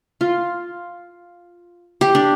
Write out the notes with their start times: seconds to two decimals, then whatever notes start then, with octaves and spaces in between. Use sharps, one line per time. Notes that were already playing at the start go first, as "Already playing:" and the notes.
0.21 F4
2.01 G4
2.15 D4